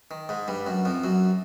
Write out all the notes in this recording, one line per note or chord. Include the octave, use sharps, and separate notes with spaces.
D#3
G#2 G#3
G2 G3
F#2 F#3
F2 F3
F#2 F#3